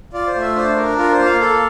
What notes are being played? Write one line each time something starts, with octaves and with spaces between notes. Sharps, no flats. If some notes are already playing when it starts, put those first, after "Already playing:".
F4 D5
C5
A3
E5
D4 C5
D4 A#4
F4 A#4
C5
A#3
F5
A4